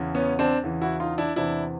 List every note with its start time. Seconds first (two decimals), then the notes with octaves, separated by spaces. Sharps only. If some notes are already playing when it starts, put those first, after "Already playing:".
Already playing: E2 C#3 E3
0.15 B3 C#4
0.39 C4 D4
0.63 E2 C#3 E3
0.82 E4 F#4
1.00 D#4 F4
1.18 D4 E4
1.36 E2 C3 E3 D4 E4